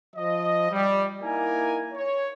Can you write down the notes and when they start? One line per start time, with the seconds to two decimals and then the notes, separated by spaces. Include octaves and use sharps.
0.16 F3 D#5
0.71 G3
1.22 A#3 D#4 E4 A#4 G#5
1.94 C#5